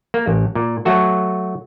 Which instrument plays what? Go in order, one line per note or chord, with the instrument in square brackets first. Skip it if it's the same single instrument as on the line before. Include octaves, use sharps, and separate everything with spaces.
[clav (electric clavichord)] A#3
A1
A#2
F#3 A3 F#4 A4